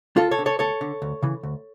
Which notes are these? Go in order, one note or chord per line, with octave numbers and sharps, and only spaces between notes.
D2 F4 A4
A4 C#5
D3
A4 C#5
D2 A4 C#5
D3
D2
C#3 E3
D2